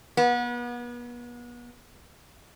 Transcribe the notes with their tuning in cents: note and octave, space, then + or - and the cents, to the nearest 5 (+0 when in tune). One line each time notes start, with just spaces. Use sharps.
B3 -35